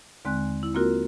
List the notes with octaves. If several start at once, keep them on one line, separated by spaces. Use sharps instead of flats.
D#2 D3 G#3 C4 G#5 F#6
E4
A#3 C4 F4 F#4 A#4